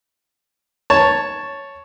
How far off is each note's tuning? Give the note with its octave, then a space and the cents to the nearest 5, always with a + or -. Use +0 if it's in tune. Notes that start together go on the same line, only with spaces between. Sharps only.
C#5 +0 A5 +0